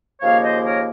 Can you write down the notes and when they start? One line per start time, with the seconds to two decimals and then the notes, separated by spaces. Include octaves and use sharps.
0.21 D#2 C#3 F3 A#3 C#5 F5
0.43 C5 D#5
0.64 A#4 C#5